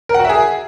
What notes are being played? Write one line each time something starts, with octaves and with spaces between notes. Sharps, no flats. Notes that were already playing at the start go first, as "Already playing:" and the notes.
A#4
F#5
F#4
E5
G#4